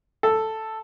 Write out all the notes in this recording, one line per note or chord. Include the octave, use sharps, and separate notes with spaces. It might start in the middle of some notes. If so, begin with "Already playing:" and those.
A4